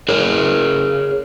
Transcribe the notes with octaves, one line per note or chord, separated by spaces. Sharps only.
G#4 A#4 C#5